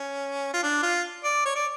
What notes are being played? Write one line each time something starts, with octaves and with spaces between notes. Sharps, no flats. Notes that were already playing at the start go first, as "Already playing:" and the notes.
Already playing: C#4
F4
D4
F4
D5
C#5
D5